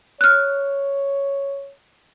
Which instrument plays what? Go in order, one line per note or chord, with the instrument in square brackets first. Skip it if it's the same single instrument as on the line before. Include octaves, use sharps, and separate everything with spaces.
[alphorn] C#5 [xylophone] F6 F#6